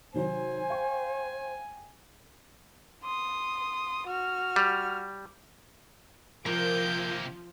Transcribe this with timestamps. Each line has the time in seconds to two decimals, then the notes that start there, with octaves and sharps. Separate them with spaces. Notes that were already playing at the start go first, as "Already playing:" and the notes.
0.14 C3 D#3 F#3 C5 G#5
0.70 F5 G5 C#6
3.03 C6 D#6
4.07 F#4 F6
4.56 G3
6.46 C3 F3 A#3 A#4 G6 D7